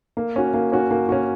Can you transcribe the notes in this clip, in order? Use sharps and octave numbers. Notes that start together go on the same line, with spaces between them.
A#3
C#4 F#4
A#3
C#4 F#4
A#3
C#4 F#4